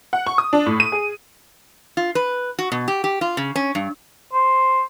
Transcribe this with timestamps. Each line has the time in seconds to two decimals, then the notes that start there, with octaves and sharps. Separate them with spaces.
0.13 F#5
0.27 C#6
0.38 D#6
0.53 D4
0.66 A2
0.80 D#7
0.92 G#4
1.97 F4
2.15 B4
2.59 F#4
2.72 B2
2.88 G4
3.04 G4
3.21 F4
3.37 C#3
3.56 C#4
3.75 G2
4.33 C5